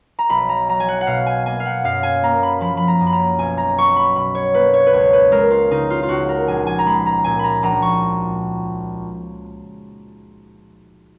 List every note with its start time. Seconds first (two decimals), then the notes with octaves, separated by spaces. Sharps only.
0.19 A#5
0.30 B1 B5
0.49 A#5
0.69 F#3 A#5
0.80 G#5
0.88 F#5
1.01 F#5
1.07 B2 F5
1.26 G#5
1.46 A#3 G#5
1.60 F5
1.65 F#5
1.84 F#2 F5
2.03 G#5
2.23 A#3 A#5
2.43 B5
2.61 F3 B5
2.77 B5
2.88 A#5
3.00 F#2
3.07 B5
3.13 A#5
3.38 B1 G#5
3.58 A#5
3.77 F#3 C#6
3.96 B5
4.15 B2 B5
4.35 C#5
4.54 A#3 B4
4.74 C#5
4.87 B4
4.93 C#2 C#5
5.13 B4
5.32 G#3 A#4
5.51 F4
5.71 C#3 D#4
5.90 F4
6.03 F4
6.09 C#2 F#4
6.29 A#4
6.47 A#1 G#5
6.67 G#5
6.79 A#5
6.86 G#3 B5
7.06 A#5
7.24 A#2 G#5
7.39 A#5 B5
7.63 A#1 A#5
7.82 C#6